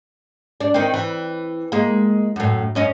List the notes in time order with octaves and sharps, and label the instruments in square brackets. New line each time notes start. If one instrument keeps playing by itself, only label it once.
[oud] D4
D#3 C4
E3
G#3 A#3
F#2 A2
F#2 C#4 D#5